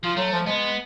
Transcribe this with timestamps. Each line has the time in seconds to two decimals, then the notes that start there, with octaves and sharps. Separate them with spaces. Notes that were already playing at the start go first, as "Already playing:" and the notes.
0.04 F3 F4
0.17 F#3 A3
0.32 F3
0.46 G#3 B3